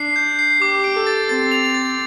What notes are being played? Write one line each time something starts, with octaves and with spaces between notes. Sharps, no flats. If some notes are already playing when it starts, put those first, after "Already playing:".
Already playing: D4 C7
G6
C7
G4 D6
D7
A4
A6
C4 A6
F7
A6